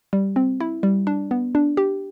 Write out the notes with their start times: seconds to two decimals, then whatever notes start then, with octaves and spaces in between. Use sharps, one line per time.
0.13 G3
0.36 C4
0.60 E4
0.83 G3
1.07 D4
1.31 B3
1.55 D4
1.77 G4